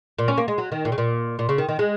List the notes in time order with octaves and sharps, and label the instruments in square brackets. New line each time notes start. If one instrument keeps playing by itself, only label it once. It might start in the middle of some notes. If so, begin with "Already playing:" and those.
[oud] A#2
C#4
A#3
G#3
F#3
D#3
A#2
C#3
A#2
A#2
C#3
D#3
D#3
G#3